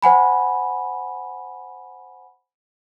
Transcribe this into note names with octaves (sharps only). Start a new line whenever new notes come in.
C5 F#5 G#5 B5